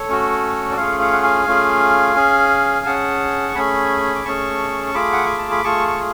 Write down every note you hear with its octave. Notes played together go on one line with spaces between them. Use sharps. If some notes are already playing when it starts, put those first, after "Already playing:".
Already playing: A4 C#5
A3 C#4 F#4
D5
A3 C#4 F4 G#4 C#5 F5
C#5 F5
F#5
F5 G#5
A3 C#4 F4 G#4
C#4 G#4
C#4 G#4 F#5 A5
C#6
A3 C#4 G#4 G#5 B5
D6
A3 C#4 G#4 A5 C#6
C#6
A3 F4 G#4 B5 D6
F#5
G#5
A5
B5
A3 F4 G#4 A5 C#6
C#6